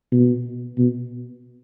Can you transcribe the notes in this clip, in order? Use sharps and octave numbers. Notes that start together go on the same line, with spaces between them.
B2
B2